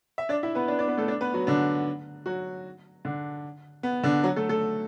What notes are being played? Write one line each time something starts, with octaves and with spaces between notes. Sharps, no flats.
E5
D4 D5
E4 E5
B3 B4
D4 D5
D4 D5
B3 B4
A3 A4
D4 D5
B3 B4
F#3 F#4
D3 D4
F#3 F#4
D3 D4
B3
D3 D4
F#3 F#4
A3 A4
A3 A4